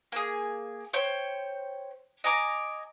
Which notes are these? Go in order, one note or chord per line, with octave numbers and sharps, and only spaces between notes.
A#3 G#4
C5 C#5 G5
D#5 G#5 A#5 D6